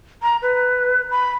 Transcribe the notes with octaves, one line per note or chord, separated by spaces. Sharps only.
A#5
B4
B5